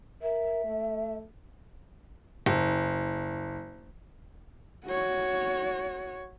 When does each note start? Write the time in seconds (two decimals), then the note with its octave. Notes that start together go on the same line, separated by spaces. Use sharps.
0.22 A#4 E5
0.64 A3
2.46 F#1
4.85 F#4 C#5